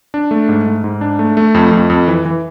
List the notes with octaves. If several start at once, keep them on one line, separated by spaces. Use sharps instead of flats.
D4
A3
G#2
G#2
G#2
D4
A3
A3
F2
F2
F2
E3
E3